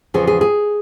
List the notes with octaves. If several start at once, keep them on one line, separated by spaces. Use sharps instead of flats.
E2 C#3 F3 G#4
G#4
G#4